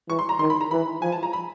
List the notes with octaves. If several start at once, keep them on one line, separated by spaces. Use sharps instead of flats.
E3 C#6
C6
A#5
D#3 C6
B5
A#5
E3 B5
F3 G#5
A5
A#5
B5